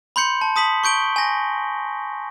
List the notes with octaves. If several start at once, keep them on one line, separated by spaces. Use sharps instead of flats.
B5 C6 G6 C#7
A5
A5 D#6 B6 F#7
C#6 G6 D7 G7
G#5 A#6